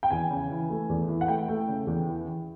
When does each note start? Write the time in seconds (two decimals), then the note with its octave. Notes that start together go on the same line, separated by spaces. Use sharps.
0.03 G5
0.10 E2 G#5
0.31 C#3
0.50 E3
0.70 A3
0.89 E2
1.08 E3
1.21 F#5
1.28 A3 G5
1.48 A3
1.68 C#3
1.87 E2
2.06 E3
2.26 E3